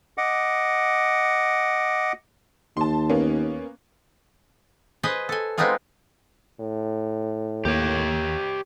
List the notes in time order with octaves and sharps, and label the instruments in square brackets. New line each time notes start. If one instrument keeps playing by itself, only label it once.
[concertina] D#5 F#5 D6
[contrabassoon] D#2 [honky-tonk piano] A5 C6
[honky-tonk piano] A#3 B3 C#4
[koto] G#4 B4 C5 D#5
A4 G#5
G#3 B3 C4 D#4 F4 G#4
[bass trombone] A2
[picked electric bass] D#2 A#3 [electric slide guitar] G4 C#5